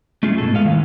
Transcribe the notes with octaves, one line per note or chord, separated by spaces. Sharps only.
A3 C#4 F4 G#4
G#2 B2 A4
G#3 B3 F5
D#3 E3 G#3